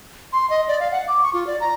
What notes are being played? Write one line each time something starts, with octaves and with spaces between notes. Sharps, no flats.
C6
D#5
D5
F5
F#5
D6
C#6
F4
D5
A#5